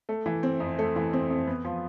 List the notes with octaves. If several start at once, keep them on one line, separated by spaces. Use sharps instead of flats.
A3
E3
C4
F2
A3
E3
C4
F2
B3
F3